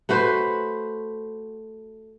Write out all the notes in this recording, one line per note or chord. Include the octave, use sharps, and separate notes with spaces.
A3 F#4 B4 C5